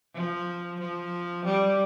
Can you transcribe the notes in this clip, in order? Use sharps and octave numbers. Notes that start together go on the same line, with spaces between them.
F3
F3
G3